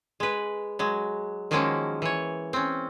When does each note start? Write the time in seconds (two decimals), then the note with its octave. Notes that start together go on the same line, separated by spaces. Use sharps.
0.20 G#3 B4
0.79 F#3 G#3
1.51 D#3 F3 F#3 G#3 A#3 C#4
2.02 E3 C#5
2.53 C4 C#4